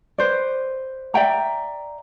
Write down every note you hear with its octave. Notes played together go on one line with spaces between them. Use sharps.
B4 C5 D5
D5 E5 G5 A#5